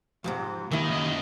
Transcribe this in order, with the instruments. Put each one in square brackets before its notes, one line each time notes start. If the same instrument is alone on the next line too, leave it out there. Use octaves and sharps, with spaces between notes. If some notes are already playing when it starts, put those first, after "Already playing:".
[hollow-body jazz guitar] F2 G#2 C3
[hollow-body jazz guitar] D#2 E4 [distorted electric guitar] D#3
[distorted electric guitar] F#2 D#5